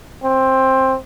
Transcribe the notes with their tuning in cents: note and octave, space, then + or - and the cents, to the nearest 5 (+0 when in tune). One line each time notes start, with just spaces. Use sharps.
C4 +15